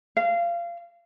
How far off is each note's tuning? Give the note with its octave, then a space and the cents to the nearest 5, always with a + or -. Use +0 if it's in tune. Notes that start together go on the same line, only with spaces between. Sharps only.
F5 -25